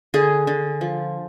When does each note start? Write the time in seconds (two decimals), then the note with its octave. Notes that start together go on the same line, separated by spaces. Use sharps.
0.14 D3 G#4
0.47 D3
0.81 F3